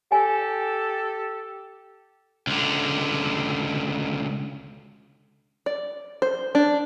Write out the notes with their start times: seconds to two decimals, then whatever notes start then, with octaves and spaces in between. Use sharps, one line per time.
0.12 G4 A4 G#5
2.47 C#2 D3
5.66 D5
6.22 C5
6.55 D4